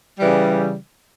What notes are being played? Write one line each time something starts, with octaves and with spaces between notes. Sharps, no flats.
C#3 E3 G3